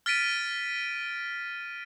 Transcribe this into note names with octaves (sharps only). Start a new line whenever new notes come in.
F6 A6 B6 D7 D#7